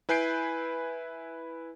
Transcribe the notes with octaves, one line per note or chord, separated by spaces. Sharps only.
E4 B4 G#5 G6 C7 D7